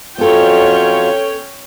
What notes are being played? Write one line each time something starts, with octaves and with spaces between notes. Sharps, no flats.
F2 F#3 B3 C#4 F4 A4 C#5 G5